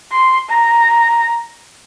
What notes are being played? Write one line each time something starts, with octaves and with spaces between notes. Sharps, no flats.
C6
A#5